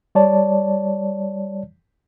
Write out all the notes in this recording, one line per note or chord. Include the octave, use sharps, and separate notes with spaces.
G3 C#5 D5 A5